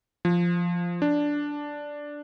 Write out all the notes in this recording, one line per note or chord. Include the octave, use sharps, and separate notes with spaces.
F3
D4